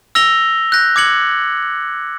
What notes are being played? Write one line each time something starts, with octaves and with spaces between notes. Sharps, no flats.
E6 A#6 F7 G7
F#6 G6 A#6
D6 G#6 C#7 F#7